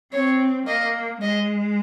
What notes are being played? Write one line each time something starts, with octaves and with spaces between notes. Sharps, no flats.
C4 C#5
A#3 D#5
G#3 D#5